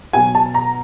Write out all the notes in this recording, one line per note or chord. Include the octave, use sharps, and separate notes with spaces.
B2 F#3 G#5
A5
A#5